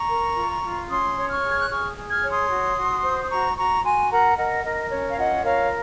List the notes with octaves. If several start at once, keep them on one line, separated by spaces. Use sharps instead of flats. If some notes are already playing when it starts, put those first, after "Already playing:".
Already playing: A#5 C#6
A#4
F4
F4
C#4 C6 D#6
C#5
C#6 F6
G#4
G#6
F#6
G#4 C#6 F6
G#4
F6 G#6
C#5
C6 D#6
F#4
F#4
C5
D#6
F#4 A#5 C#6
F#4 A#5 C#6
F#4 G#5 C6
A#4 F#5 A#5
A#4 D#5 F#5
A#4 D#5
C#4 C#5
F5
F4 D#5 F#5
A#4 C#5 F5